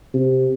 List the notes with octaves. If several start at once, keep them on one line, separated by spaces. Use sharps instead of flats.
C3